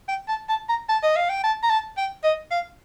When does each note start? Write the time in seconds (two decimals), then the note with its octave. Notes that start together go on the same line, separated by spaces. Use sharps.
0.08 G5
0.28 A5
0.49 A5
0.69 A#5
0.89 A5
1.03 D#5
1.16 F5
1.29 G5
1.44 A5
1.63 A#5
1.70 A5
1.97 G5
2.24 D#5
2.51 F5